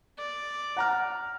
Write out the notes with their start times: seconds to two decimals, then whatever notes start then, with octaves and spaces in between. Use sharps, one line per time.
0.18 D5
0.77 F#5 A#5 F6